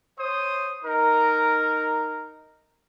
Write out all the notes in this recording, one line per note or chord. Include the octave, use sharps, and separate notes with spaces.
C5 C#5 D#6
D#4 A#4